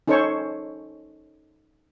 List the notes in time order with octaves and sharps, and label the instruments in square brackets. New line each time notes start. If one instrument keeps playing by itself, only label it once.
[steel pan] C#4 D#4 A4 C5 C#5 C#6